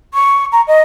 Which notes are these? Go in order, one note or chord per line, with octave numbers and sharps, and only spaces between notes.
C#6
A#5
D#5